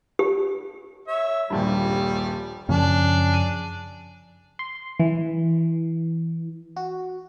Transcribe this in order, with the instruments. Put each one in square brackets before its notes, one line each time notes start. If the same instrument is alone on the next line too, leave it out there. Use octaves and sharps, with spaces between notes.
[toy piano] G4
[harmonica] C#5 E5
[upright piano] D#1 A#1 G2 [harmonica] G3
[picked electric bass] F#2 C#3 F3 [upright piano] C#4 [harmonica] D4 G#4
[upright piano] D#7
[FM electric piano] C6
E3
F#4